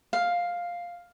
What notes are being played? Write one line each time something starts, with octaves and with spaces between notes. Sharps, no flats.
F5